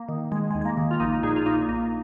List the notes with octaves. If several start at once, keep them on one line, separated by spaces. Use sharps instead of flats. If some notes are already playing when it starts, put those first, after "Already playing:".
Already playing: A#3
D#3
D#3 G#3
G#3
D#2
G#3
A#3
D#3
F4
A#1 A#3 D#4
A#2 D#4 G#4
F4
A#2 A#3 D#4
A#1 A#3